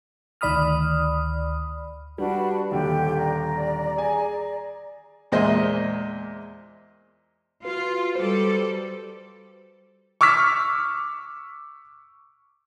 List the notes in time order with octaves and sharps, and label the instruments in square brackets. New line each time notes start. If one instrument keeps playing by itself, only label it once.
[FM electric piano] D2 D#3 D5 B5 D#6 F6
[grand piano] G3 [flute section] D4 F#4 B4
[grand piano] D#1 D#2 D3 [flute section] G4 G5
[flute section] D5 A#5
[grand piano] G#4 G#5
[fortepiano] E2 A#2 G#3 C5 D#5 E5
[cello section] F4 [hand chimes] F#4 B4
[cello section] G3 A4 [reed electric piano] C5
[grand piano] C#6 D6 E6 F6 B6